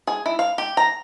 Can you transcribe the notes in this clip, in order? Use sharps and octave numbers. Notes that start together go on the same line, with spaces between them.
G#4
E4
F5
G4
A#5